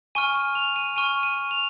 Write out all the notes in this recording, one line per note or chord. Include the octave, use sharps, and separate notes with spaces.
G#5 C#6 F6 D#7
D#7
F7
D#7
G#5 C#6 F6 D#7
D#7
F7